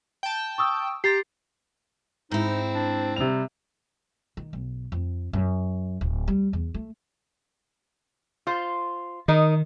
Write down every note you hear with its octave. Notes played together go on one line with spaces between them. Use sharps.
G5 A5
C#6 D#6 E6
G4 A#5 C6 A6 C7
G#2 C4 D#4 E4
D4
C3 G3 F7
D#3
B1
F2
F#2
D1
G3
E2
A3
F4 C5
D#3 D#4 A#4 D#5